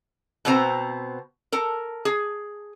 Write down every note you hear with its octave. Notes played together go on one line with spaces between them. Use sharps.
B2 B3 C4 C5 A#5
A4 A#4
G#4